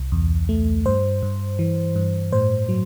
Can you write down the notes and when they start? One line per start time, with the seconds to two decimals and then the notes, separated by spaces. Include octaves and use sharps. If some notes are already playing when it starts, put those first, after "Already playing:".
Already playing: C2
0.12 E2
0.49 A3
0.86 G2 C5
1.23 G2
1.59 E3
1.96 G2
2.32 A2 C5
2.69 F#3